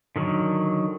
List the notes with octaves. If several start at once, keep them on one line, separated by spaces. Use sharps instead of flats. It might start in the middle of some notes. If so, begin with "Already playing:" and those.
D3 D#3 F#3